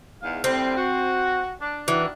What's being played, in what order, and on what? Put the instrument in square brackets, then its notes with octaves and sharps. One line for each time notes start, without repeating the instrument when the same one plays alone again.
[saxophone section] E2 G#2 F5
[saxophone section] A2 D3 G3 [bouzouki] C4
[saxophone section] F#4
D4
[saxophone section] D#3 D4 F#4 [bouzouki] E3